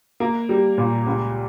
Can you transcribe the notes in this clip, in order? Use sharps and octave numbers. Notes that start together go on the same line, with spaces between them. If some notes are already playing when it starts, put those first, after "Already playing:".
A#3
G3
A#2
C#2